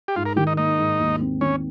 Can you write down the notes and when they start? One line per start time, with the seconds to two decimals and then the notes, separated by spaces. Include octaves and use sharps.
0.08 G4
0.16 G#2 F4
0.26 A#4
0.36 D#3 G4
0.47 D#4
0.57 A#3 D#4
0.78 G#2
1.00 D#2
1.21 C4
1.41 D#3 C#4